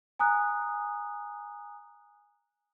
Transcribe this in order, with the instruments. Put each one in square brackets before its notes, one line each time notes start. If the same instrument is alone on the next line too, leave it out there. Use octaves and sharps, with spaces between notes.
[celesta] G#5 A#5 D#6 F#6